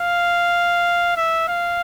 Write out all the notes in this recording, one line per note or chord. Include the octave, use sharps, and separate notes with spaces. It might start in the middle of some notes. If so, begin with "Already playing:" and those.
Already playing: F5
E5
F5